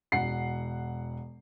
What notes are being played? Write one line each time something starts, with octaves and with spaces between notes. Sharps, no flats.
E1 F#5 C7